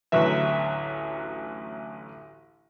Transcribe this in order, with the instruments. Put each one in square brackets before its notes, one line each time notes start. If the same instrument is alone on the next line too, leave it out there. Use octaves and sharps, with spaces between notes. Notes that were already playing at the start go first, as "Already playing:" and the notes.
[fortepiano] A1 D2 F#3 B4 E5